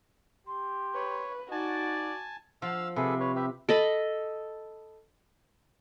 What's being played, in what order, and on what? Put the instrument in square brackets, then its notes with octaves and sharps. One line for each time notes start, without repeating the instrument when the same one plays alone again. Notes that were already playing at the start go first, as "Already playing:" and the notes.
[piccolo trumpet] G4 [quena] C6
[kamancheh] B4 [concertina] C#5
[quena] D#4 [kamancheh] F#4 [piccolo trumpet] D5 [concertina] G#5 A5
[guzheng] F3 [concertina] F5 E6
[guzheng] C3 [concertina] G#4 A4 B4
[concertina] B4 C#5
G4 B4 E5
[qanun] A4 D#5 B5